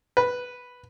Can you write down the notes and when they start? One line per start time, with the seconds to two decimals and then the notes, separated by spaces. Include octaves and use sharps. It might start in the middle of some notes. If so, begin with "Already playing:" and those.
0.17 B4